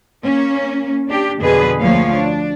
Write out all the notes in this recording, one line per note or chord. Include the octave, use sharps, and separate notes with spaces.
A#3 C#4
D4 G4
F2 B2 D3 G#4 B4
D2 F3 A#3 C#5 F5
D4